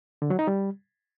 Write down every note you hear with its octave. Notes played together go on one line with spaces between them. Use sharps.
D3
F#3
D#4
G3